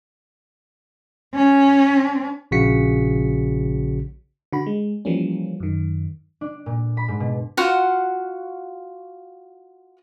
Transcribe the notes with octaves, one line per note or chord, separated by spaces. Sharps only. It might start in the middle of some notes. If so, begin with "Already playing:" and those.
C#4
A#1 C#3 F#4 B6 C#7
D3 F#4 B5
G#3
E3 F3 G3 A#3 C#4
F#2 D#3
D4
A#2
B5
G#2
B2
F4 F#4 F5 F#5